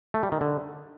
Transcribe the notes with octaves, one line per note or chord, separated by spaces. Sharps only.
A3
G3
D#3
D3